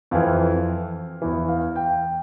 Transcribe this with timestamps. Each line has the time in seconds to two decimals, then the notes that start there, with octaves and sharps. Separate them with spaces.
0.11 F2 E3 F5
1.22 E2 E3
1.49 F5
1.76 G5